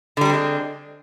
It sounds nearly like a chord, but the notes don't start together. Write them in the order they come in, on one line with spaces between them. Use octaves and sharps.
D3 G3 D4 C4 G#3